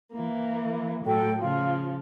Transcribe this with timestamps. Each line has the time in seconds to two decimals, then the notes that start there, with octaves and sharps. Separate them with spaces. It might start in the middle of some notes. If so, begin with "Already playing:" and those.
0.13 E3 A#3
1.05 A2 F#3 A4 G5
1.39 C#3 F3 F4